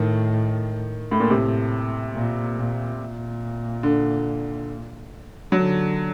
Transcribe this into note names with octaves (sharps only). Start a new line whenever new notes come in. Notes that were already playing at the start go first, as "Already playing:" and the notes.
Already playing: A2 D#3
A2
A#2
A2 C3
A#2
A#2
A#2
D3
D3 F#3